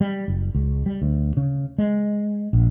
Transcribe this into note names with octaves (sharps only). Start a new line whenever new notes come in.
G3
F#1
C#2
G3
D2
C#3
G#3
A#1